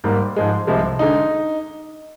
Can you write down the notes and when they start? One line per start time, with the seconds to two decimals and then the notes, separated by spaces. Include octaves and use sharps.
0.04 G#2 G3 A#3
0.36 G#2 F3 G#3
0.67 C2 C3 F3 G#3
0.99 D3 G#3 D#4